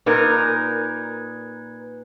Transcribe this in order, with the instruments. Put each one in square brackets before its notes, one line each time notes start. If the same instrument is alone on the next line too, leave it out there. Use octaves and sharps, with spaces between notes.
[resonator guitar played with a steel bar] A#2 D#4 A#4 [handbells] B4 G#6